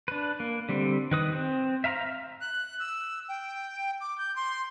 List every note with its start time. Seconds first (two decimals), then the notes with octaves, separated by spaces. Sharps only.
0.08 D4 B4
0.40 A#3
0.69 D3 G3 C4
1.11 D#3 B4 D#6
1.32 C4
1.84 E5 F5 A#5 B5 F6
2.41 F#6
2.80 E6
3.29 G5
4.01 D6
4.18 G6
4.36 C6